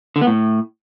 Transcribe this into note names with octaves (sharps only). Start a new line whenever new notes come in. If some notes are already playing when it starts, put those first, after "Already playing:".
D3
B3
A2